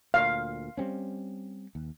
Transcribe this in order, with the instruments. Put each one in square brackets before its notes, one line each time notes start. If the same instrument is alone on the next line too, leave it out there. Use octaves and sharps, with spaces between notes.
[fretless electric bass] D2 A#2 [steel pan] F5
[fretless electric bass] G3 C4 C#4
D#2